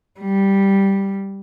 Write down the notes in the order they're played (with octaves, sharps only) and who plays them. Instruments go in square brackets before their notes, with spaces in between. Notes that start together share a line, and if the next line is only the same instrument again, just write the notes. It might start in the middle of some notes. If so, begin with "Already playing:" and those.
[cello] G3